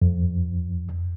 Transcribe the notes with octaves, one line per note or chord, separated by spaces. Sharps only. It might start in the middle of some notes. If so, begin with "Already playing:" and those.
F2